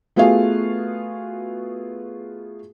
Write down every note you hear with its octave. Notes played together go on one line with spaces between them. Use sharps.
A3 B3 F4 F#4 G#4 F5